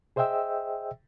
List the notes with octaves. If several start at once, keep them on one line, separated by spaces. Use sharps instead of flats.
G#4 C5 D#5 E5 G5 E6